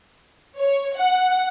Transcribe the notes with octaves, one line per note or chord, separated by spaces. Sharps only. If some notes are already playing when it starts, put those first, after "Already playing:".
C#5
F#5